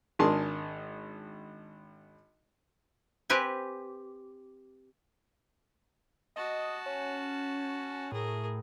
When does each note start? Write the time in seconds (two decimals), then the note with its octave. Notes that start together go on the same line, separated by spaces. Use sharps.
0.19 G#1 D4 G#4 A#4 A5 C6
3.30 C4 G4 B4 G#5
6.36 F#4 D#5 A5
6.86 C#4
8.12 A2 G#4 A#4